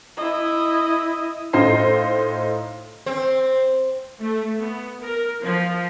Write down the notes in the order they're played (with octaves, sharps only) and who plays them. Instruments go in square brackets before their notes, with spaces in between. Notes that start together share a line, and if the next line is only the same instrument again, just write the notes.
[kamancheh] E4 D#5
[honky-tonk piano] A2 D#4 F4 C5 C7
[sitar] C4
[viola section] A3
B3
A#4
F3